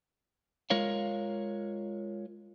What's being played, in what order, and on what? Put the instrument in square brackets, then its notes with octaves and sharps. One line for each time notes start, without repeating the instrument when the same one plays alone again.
[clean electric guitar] G#3 F4 A#4 C#5 F5